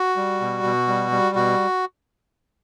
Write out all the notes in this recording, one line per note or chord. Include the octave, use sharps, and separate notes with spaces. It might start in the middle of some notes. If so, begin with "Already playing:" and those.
Already playing: F#4
G3
B2
B2
G3
G3
B2 F#4